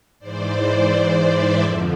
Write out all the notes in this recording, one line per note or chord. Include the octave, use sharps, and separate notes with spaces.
G#2 E3 C5 D5
D5 E5
F2 D3 F3